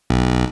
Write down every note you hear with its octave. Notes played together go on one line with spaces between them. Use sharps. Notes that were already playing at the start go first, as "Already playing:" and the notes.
B1